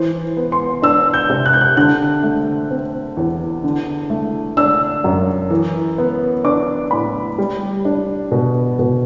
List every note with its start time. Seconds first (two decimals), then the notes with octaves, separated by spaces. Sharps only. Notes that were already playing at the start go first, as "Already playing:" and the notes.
Already playing: E3 C5
0.37 B3
0.52 C6
0.82 D4 E6
1.14 G6
1.29 C3
1.46 F#6
1.53 G6
1.61 F#6
1.77 D3 F#6
2.23 A3
2.71 C4
3.17 E2
3.64 D3
4.10 A3
4.57 D4 E6
5.04 F#2
5.50 E3
5.98 B3
6.44 D4 D6
6.91 A2 B5
7.38 G3
7.85 D4
8.32 B2
8.79 B2